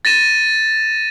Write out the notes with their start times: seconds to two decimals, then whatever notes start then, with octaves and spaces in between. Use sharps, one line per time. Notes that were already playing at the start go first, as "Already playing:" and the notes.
0.05 A6 A#6 D#7 E7